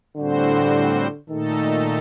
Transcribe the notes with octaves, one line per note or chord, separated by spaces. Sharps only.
A2 D3 G3 C4 F#4 C5
A#2 D#3 A3 D#4 A4